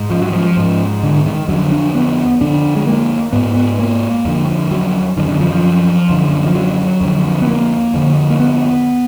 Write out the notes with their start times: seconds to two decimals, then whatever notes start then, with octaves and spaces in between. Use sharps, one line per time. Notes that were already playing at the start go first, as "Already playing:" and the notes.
Already playing: G#2
0.10 F3
0.21 F#3
0.32 F3
0.57 G#2
1.03 D3
1.26 D#3
1.48 F2 D3 F#3
1.72 D4
1.95 B3
2.40 F2 D3 D4
2.76 G#3
2.87 A#3
3.32 G#2 B3
3.55 B3
3.79 A#3
4.25 F2 D3
4.71 F#3
5.17 F#2 D3 D#3
5.28 D3
5.40 F3
5.52 F3
6.09 F#2 D3
6.46 F3
6.55 F#3
7.01 F2 D3
7.42 B3
7.47 A#3
7.94 F2 D3
8.30 A#3
8.40 B3